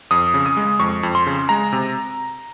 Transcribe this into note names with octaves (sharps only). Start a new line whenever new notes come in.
F2 D#6
C#3
D#6
G#3
F2 C#6
F2
C6
C#3
G#3 A#5
C3